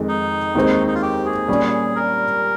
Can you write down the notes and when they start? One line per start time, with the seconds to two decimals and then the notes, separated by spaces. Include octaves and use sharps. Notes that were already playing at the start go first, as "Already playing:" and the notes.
Already playing: F2 D#3 G#3
0.08 D#4
0.55 D#2 D#3 G#3 C4
0.87 D#4
0.94 F4
1.02 G4
1.25 G#4
1.48 A#2 G3 C#4
1.95 A#4